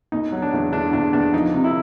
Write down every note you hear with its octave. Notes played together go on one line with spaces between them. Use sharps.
B2 D#4
F#3
D4
E2
E2 D4
E2 D4
E2 D4
F3 D#4
C3
E4